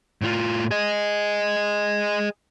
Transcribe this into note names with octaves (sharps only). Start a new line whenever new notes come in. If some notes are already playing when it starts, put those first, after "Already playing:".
A2 F4
G#4 D#5